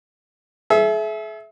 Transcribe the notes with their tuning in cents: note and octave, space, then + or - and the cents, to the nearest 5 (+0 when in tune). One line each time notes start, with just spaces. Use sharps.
G#4 +45 E5 +0